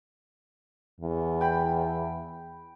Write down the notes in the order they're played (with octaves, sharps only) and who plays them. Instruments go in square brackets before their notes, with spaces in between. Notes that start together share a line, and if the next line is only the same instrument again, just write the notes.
[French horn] E2
[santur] G5 B5